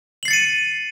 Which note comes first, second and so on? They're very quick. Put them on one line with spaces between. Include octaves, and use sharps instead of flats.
F#7 C7 A6 C#7 D#7